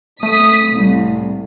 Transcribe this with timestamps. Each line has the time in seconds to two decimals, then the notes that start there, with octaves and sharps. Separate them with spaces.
0.23 A3 D#6 B6
0.73 C2 A2